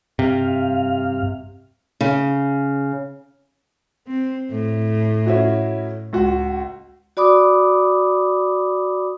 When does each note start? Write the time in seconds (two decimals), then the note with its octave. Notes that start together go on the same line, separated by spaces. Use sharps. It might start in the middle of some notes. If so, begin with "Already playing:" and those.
0.19 G2 C3 F5
2.01 C#3
4.07 C4
4.51 A2
5.26 C#4 E4 F#4
6.13 C#2 F#4
7.17 F#4 D5 B5 D6 D#6